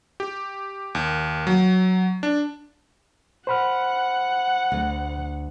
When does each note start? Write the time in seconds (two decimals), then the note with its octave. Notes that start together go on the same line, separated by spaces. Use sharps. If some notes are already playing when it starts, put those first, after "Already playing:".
0.20 G4
0.95 D#2
1.47 F#3
2.23 D4
3.47 C5 F#5 B5 F6
4.72 D2